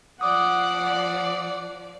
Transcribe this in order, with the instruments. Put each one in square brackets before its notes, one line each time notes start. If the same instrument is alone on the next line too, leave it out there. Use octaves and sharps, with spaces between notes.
[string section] F3 D5 [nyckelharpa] F#5 [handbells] D6 D#6